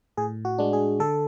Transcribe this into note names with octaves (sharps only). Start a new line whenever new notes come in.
A2 G#4
F#4
G#3 D4
G#4
D3 A4